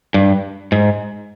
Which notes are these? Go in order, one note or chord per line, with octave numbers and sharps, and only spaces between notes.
G2
G#2